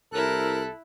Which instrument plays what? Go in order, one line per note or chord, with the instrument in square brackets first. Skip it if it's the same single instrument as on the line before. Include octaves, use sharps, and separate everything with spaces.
[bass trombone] C2 [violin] E4 F#6 [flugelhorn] A4 [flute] A#4